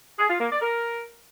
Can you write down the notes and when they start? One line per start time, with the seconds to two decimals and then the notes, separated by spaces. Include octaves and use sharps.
0.19 G#4
0.30 F4
0.40 A#3
0.51 D5
0.62 A#4